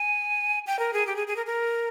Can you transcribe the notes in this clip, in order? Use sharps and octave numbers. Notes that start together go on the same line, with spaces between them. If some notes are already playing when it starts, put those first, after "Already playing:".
Already playing: G#5
G5
A#4
G#4
G4
G#4
G#4
A#4
A#4